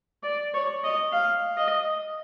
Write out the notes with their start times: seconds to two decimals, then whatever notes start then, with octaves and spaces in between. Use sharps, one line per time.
0.23 D5
0.54 C#5
0.84 D#5
1.13 F5
1.57 D#5